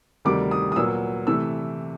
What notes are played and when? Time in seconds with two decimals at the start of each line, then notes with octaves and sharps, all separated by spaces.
0.25 D2 C3 D#3 G3 D6
0.51 D#6
0.72 D#6
0.76 A#2 F#3 B3 E6
1.27 C3 E3 A3 E6